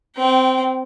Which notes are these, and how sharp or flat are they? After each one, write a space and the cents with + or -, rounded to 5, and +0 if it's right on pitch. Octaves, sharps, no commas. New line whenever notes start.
C4 -10 G5 -30